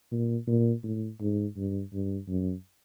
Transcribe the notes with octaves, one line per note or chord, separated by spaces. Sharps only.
A#2
A#2
A2
G#2
G2
G2
F#2